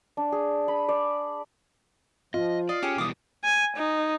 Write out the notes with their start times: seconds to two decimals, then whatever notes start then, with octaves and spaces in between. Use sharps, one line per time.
0.17 D4
0.32 G#4
0.68 B5
0.89 D5
2.34 F3 F4 D#5
2.69 D5 D#5 F5
2.83 C#4 G4 G#4
2.98 B2 E3 G3 D6 D#6
3.44 G#5
3.77 D#4